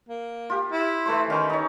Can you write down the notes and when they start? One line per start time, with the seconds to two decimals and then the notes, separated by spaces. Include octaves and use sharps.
0.09 A#3
0.50 F4 G4
0.72 E4
1.06 E3 A3 C5
1.30 D#3 C#4 B5
1.50 D#4 C#5